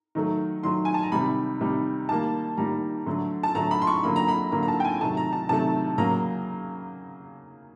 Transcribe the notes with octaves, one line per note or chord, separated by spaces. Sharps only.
D#3 F#3 A3
D#3 F#3 A3 C6
G#5
A5
A#5
C3 D#3 G3 B5
C3 D#3 G3
D#3 G3 A#3 A5
D#3 G3 A#3 A#5
D3 F#3 A3
A5
D3 F#3 A3 A#5
B5
C6
C#6
D3 F#3 A#3 B5
A#5
B5
D3 F#3 A#3 A#5
A#5
A5
G5
G#5
C3 D#3 F#3 A3 A5
A#5
A5
C3 D#3 F#3 A3 A5
C#3 F#3 A#3 A#5